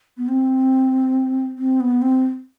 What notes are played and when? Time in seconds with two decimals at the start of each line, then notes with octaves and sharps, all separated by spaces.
0.17 B3
0.28 C4
1.58 C4
1.80 B3
2.02 C4